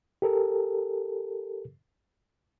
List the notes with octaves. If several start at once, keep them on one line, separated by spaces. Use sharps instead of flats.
G4 A4 A#4